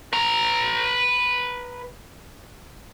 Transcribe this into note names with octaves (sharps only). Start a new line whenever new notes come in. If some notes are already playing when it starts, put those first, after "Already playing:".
B4 A#5